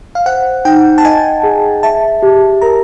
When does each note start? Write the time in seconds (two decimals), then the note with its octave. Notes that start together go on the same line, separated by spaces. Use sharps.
0.15 F5
0.26 C5 F#5
0.65 D#4 G5
0.98 A5
1.05 D#5 G#5
1.43 G#4
1.83 E5 A5
2.22 G4
2.61 A#4 A#5